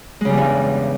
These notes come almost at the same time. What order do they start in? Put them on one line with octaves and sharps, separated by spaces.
G#3 C#3 G3 E2 G2